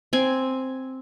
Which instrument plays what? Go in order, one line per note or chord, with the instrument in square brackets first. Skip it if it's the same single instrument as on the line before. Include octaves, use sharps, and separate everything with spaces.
[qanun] C4 G#5